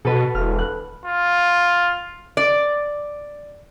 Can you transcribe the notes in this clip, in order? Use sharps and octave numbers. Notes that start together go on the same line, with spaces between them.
B2 A4 B4
E1 F6
F#6
F4
D5